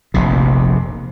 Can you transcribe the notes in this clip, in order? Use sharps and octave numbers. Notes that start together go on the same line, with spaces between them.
F1 A#1 C3